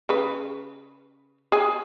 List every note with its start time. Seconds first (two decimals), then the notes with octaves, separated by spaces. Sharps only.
0.09 C#3 B4
1.52 G#4 G#5